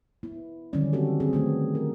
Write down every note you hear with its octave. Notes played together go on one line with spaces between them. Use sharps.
B3 E4
D3 D#3 F#3 G3 C#4 D5
G3 C4 F#4 G4 A4
C4 G#4
D#3 A3 B3
A#4